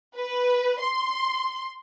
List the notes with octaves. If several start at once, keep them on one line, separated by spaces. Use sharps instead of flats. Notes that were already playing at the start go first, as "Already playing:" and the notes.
B4
C6